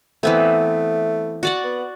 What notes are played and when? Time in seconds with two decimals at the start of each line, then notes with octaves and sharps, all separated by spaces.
0.23 E3 A3 B3 C4
1.43 F#4 D5 F#5
1.64 B3